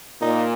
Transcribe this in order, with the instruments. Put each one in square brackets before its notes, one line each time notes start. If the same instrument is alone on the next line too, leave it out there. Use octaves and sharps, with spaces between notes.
[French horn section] A#2 [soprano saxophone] D#4